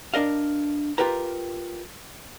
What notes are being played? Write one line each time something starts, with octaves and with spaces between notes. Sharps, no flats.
D4 A#4 D#5 F5
F4 G4 A#4 B4 A#5